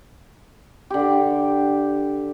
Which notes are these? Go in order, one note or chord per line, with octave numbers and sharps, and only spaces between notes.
D3 G4